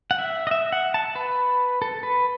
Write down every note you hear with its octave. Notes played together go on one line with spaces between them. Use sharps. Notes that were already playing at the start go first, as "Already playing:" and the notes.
F#5
E5
D#5
E5
F#5
A5
B4
A4
B4